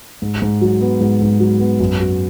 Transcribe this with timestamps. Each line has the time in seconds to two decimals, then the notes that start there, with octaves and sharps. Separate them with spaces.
0.22 G#2
0.42 G#2
0.61 F#3
0.81 B3
1.01 G#2
1.21 G#2
1.40 F#3
1.60 B3
1.80 F#2
2.00 F#4